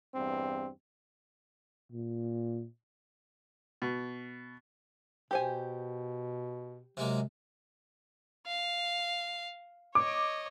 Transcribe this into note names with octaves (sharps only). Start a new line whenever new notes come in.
E2 G2 C4
A#2
B2
B2 G4 C5 G#5
C3 F#3 G#3 A#3
F5
C#5 D#5 D6